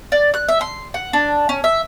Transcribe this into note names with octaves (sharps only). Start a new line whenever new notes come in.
D5
F#6
E5
C6
F#5
D4
C#4
E5